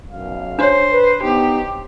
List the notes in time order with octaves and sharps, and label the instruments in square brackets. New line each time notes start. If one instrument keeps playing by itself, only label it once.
[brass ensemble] B1 F#2 F5
[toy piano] D4 C#5 [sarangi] C5
[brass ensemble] B4
[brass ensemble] B3 D#4 [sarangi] G4